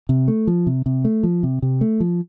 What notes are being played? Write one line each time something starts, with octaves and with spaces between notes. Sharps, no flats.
C3
A3
F3
C3
C3
A3
F3
C3
C3
A3
F3